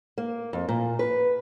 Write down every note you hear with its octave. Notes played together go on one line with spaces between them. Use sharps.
A#3
F2
A#2
B4